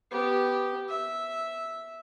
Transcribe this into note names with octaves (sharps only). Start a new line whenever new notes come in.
B3 G4
E5